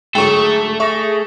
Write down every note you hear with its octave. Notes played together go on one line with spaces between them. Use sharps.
G#2 D3 F#3 A3 G#4 A4 G5 C#6
G#4 E5 C#6 A#6